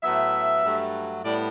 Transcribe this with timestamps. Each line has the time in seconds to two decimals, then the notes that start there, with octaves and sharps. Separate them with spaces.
0.02 A2 F#3 B3 E5
0.64 G2 F#3 A3
1.23 A2 G3 B3 D5